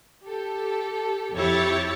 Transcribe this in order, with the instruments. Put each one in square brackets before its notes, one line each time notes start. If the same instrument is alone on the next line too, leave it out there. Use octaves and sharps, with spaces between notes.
[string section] G4 A4
F2 E4 G4 C#5 A6